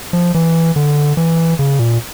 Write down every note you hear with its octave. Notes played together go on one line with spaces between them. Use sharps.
F3
E3
D3
E3
C#3
A#2